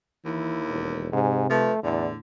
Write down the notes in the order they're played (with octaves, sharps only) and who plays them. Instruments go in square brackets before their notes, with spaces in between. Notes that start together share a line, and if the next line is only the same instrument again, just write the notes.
[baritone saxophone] D#2 [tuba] E3 [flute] E4
[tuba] E1
[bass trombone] G#2 [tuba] C3 [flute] G#5
[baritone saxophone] F3 [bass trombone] A3 [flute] B4
[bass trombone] E2 [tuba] A2 [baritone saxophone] D3 [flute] D5